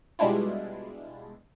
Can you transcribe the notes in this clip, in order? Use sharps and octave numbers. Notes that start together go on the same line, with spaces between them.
B2 G3 G#3 D4 E4 F4